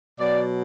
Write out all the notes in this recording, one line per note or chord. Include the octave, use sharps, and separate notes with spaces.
B2 F#3 D5